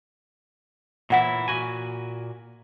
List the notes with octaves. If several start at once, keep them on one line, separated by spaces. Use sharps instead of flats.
A#2 E3 E4 C#5 F#5
A#2 F#4 G#5